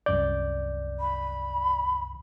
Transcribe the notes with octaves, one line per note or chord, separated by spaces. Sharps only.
C2 F#2 D5 G6
B5